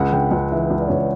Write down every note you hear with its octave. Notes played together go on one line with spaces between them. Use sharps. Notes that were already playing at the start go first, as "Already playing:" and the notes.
Already playing: C#2 C#3 F#5
C#3 G5
C#2 F#5
E3 E5
C#2
D5
C#2 C#5
D5